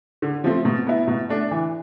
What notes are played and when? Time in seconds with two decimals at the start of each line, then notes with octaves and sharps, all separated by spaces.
0.22 D3
0.44 F3 A3 C4
0.65 B2
0.87 B3 E4
1.08 B2
1.29 A3 D4
1.51 E3